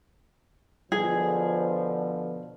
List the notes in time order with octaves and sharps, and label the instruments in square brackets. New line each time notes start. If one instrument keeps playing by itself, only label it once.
[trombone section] B2 D3 F3 [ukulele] G#4